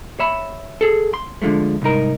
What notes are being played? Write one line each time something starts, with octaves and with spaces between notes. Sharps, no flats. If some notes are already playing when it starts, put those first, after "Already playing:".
C#5 E5 B5
G#4 A4
C6
D3 D#3 F3 G#3 A3
C2 G#2 D#4 A#4